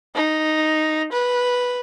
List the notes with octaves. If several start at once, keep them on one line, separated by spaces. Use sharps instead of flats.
D#4
B4